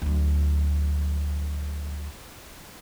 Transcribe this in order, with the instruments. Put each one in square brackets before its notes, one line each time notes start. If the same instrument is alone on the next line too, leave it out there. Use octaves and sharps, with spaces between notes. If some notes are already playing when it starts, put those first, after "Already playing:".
[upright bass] D2 F#3